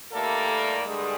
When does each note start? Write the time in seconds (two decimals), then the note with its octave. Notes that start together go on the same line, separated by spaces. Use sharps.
0.13 G2 D#3 G3 A3 A#3 A4
0.85 G2 D3 G3 G#3 G#4